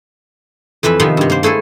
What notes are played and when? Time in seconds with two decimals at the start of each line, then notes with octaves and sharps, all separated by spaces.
0.83 F2 E3 B4 E5
0.99 C3 D#3 F3 B3 E5 C6
1.17 G2 C3
1.30 A#3 C5
1.43 A3 E4 G#4 A4